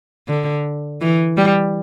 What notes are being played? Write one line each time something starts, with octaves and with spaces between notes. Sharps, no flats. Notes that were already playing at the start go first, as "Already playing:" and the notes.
D3
E3
G3